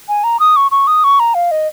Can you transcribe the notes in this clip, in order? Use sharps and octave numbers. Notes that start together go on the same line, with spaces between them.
G#5
A#5
D#6
C#6
C#6
D#6
C#6
A#5
F5
D#5